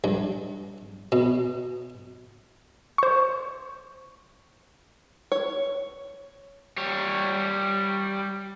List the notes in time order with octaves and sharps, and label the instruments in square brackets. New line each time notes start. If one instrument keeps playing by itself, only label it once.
[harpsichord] G2
B2
[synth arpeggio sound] C5 C#6
[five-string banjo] C#5
[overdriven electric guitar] G3 C#5